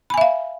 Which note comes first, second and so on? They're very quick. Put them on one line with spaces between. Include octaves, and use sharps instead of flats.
B5 G#5 E5 F5